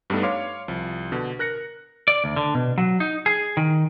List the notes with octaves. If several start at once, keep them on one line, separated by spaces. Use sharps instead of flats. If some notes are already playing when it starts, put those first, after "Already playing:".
G2 G3 A3 B3 D#4 A4
C#5 F5 C6 D6
C2 F3
B2 D3
A#4 F#6 A#6 C#7
D5
D2
D3
B2
F#3
D#4
G#4
D#3